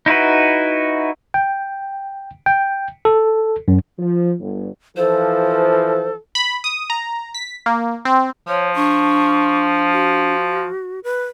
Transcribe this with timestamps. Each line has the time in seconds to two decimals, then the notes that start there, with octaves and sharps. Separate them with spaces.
0.06 D#4 E4 F#4 B4
1.34 G5
2.46 G5
3.05 A4
3.68 F#2
3.99 F3
4.39 G1
4.97 E3 F3 A4 C5
6.35 B5
6.64 D#6
6.90 A#5
7.34 B6
7.66 A#3
8.05 C4
8.48 F3 C#5
8.76 D4 C#6
9.91 F#4
11.04 B4